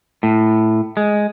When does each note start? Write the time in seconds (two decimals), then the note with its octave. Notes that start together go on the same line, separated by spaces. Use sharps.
0.23 A2
0.97 G#3